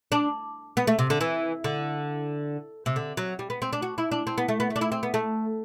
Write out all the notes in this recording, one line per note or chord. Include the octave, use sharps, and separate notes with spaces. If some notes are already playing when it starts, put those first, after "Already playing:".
D4
B3
A3
C3
D3
E3
D3
C3
D3
F#3
G3
B3
C4
D4
F#4
E4
D4
C4
B3
A3
B3
A3
D4
E4
C4
B3
A3